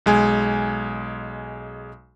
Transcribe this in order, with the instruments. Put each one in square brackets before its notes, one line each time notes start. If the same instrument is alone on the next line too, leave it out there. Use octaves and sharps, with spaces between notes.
[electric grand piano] B1 G#3 G#5